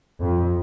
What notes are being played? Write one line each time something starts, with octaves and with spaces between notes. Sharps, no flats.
F2